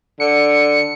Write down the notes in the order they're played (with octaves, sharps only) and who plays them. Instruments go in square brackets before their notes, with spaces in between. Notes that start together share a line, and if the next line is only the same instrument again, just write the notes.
[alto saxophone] D3 [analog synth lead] C#7